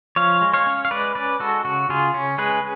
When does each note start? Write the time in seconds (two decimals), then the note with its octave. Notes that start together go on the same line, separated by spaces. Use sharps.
0.16 F3 C#5 F5
0.41 G#3
0.54 C#5 F5
0.66 C#4
0.85 F5
0.91 G#3 B4 D5
1.15 C#4 B4 D5
1.40 G#3 F#4 A4
1.65 C#3 F#4
1.89 C#3 F4 G#4
2.14 C#4
2.38 G#3 G#4 B4